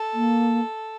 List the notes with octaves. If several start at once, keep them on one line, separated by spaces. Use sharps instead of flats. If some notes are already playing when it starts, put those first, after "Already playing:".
Already playing: A4
A#3